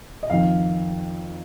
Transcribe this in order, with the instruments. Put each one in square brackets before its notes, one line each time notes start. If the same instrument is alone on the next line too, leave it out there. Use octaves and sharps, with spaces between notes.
[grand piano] D#5
F2 D#3 F5